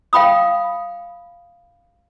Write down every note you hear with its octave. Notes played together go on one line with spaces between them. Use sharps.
F5 G5 B5 D#6